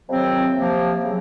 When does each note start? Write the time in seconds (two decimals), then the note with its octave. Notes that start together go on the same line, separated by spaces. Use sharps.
0.09 F2 C3 D#3 F#3 C4
0.57 C3 F3 A#3
1.03 C#3 F#3